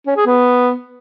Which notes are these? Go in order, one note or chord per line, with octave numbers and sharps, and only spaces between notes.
C#4
G#4
B3